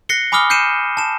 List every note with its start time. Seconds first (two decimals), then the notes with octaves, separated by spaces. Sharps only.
0.09 F#6 A#6 C7 C#7 G7
0.32 G#5 B5 D6 D#6 F6 G7
0.50 G6 C7 C#7 D#7 E7
0.97 A5 E7